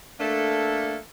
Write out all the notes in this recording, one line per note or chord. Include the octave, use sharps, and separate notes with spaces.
A3 A#3 D4 A4